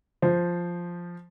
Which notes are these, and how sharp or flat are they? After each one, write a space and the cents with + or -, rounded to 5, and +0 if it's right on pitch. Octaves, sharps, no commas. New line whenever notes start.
F3 +0 C5 +0